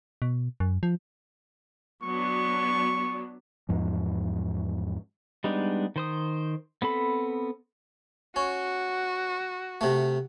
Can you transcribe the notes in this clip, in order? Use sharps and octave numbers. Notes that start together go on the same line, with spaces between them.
B2
F#2
F3
F#3 B3 D4 C#6
E2 G#2 F3
G3 G#3 B3 D4 D#4
D#3 C5 D#6
B3 C4 A4 B5
C#4 F#4
C3 A3